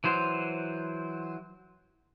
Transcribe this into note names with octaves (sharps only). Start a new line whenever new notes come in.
E3 F#3 C5